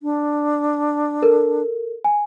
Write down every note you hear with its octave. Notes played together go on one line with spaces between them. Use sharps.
D4
A4 A#4
G#5